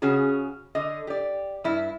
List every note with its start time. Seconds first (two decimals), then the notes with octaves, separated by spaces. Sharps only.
0.02 C#3 C#4 F#4 G#4
0.75 D3 D#5
1.07 G4 D5
1.64 G2 E4